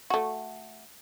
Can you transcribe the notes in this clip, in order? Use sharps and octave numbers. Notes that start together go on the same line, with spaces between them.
A3 F#4